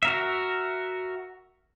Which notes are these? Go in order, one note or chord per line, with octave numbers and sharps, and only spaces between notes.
F#4 A#4 E5